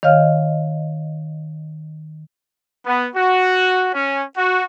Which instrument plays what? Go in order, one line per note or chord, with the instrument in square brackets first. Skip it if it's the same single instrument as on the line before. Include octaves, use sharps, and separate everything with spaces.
[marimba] D#3 C#5 D#5 F5 F6
[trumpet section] B3
F#4
C#4
F#4